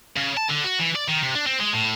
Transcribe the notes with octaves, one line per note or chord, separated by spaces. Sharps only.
C#3
A5
D3
F#4
E3
D5
D#3
C3
D4
C4
G#3
A2